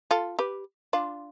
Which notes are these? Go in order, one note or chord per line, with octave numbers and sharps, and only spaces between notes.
F4 A4
G4 B4
D4 F4